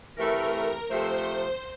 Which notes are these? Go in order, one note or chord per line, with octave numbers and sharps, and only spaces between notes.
C3 E3 A3 E4 A#4
C3 F3 A3 C5